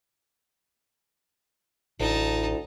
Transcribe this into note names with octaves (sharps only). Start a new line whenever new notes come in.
A1 D2 D#4 E4 A5